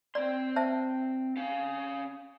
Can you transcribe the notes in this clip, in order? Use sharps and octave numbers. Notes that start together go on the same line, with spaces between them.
C4 D5 C6
C5 E5 A5
C#4 F5